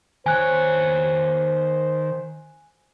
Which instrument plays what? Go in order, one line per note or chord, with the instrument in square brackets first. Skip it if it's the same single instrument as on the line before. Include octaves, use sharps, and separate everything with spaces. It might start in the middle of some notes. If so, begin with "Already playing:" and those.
[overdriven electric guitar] D#3 C#5 [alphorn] C5 [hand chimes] G#5 F#6